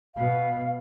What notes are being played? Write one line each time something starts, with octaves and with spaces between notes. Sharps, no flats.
B2 B3 F5